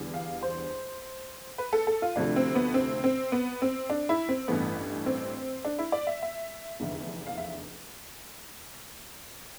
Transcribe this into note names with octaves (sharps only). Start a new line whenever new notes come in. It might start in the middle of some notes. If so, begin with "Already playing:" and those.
Already playing: E2 D3 G3
F5
C5
B4
A4
A4
F4
D2 C3 F3 A3 D4
C4
B3
C4
C4
B3
C4
D4
E4
C4
A1 G2 E3 A3 B3
C4
D4
E4
D5
E5
E5
F1 E2 D3
F5
E5